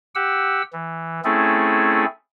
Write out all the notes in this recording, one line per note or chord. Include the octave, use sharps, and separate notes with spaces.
G4 F#5 E6
E3
A3 C4 C#4 E4 G#4 A4